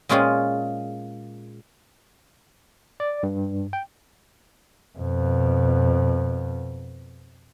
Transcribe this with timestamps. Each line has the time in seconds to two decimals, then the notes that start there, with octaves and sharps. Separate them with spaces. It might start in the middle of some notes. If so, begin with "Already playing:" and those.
0.09 A#2 G#3 C#4 F4 G#4
3.00 D5
3.23 G2
3.73 G5
4.99 F2 B2